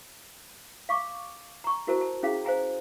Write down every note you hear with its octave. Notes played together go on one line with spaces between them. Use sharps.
F5 C#6 D6
A#5 C#6
E4 F#4 A#4 C5 A5 A#5
A5
C#4 E4 G#4 F5
C5 F5 G#5 A#5